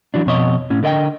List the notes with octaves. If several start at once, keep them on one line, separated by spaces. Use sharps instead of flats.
E3 F#3 D4
F2 B2 C#5 D#5
A2 C#4
D3 A#4 D#5 F5 G5